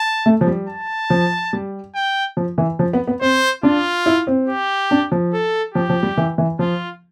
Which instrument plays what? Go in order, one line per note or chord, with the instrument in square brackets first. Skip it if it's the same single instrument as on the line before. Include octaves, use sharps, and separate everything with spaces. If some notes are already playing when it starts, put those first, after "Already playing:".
Already playing: [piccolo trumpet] A5
[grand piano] A3
F3
G3
[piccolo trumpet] A5
[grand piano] F3
G3
[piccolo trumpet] G5
[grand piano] F3
E3
F3
B3
B3
[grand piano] C4 [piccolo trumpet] C5
[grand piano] D4 [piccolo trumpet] F4
[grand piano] E4
C4
[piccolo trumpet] G4
[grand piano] D4
F3
[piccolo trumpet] A4
[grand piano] F3 [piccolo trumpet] G4
[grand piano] F3
G3
E3
E3
[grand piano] F3 [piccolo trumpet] F4